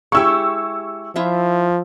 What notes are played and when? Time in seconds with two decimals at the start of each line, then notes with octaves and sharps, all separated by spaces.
0.12 G#3 E4 G4 C#6 E6
1.16 F3 E4 F4 E5